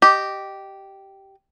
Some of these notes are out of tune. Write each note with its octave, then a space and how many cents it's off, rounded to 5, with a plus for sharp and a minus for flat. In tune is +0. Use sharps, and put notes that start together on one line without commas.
G4 -10 D#5 -15